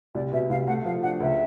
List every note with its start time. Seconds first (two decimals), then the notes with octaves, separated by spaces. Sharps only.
0.15 C2 D5
0.32 B2 E5
0.49 C2 F5
0.67 A3 F#5
0.85 F3 F5
1.02 D4 F#5
1.20 C#2 E5